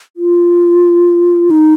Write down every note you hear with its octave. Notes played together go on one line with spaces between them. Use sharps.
F4
D#4